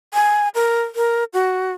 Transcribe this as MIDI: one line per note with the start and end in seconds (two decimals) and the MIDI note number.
0.14 0.48 80
0.55 0.81 70
0.95 1.24 70
1.33 1.72 66